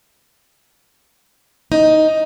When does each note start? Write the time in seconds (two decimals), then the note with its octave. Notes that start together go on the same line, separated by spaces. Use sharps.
1.72 D#4